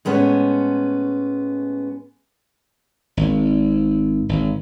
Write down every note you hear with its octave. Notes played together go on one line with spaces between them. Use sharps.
A2 G#3 B3 C#4
G#1
G#1